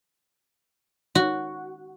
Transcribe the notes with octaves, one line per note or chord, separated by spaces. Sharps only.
F#4